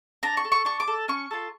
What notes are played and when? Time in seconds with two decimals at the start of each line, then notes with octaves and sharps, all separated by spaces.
0.23 D4 A#5
0.37 C#6
0.45 A4
0.52 C#6
0.65 D4 C#6
0.80 D6
0.87 A4
1.08 C#4 C#6
1.31 F4 A4